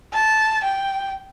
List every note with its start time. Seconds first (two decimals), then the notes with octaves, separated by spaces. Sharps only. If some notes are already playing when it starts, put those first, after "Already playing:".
0.13 A5
0.64 G5